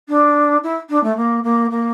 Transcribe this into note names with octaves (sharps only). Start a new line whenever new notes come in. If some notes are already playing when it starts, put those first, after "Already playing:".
D4
E4
D4
A3
A#3
A#3
A#3